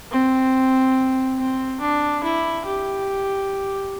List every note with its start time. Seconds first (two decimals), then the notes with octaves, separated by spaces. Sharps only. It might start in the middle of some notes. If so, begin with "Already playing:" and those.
0.11 C4
1.39 C4
1.81 D4
2.24 E4
2.66 G4